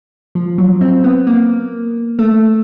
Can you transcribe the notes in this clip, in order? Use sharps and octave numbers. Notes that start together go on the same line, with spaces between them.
F3
F#3
C4
B3
A#3
A3